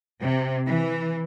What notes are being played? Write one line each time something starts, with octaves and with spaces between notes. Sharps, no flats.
C3
E3